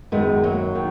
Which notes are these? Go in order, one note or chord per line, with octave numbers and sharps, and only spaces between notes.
F#2 D#3 G#3 B3
F#3 A#3
D#3